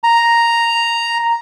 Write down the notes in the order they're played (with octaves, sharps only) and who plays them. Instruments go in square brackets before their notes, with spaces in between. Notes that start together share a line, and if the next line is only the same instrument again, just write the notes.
[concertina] A#5